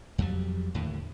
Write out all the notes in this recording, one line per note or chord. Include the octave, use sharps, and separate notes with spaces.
F2 F#3 G3
D#2 A2 D3